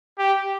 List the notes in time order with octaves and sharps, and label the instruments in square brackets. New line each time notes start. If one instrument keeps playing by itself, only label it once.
[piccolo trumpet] G4